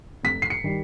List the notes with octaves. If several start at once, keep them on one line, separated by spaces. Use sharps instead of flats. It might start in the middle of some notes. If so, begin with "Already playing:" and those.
F1 B6
C7
C#7
D#3 G3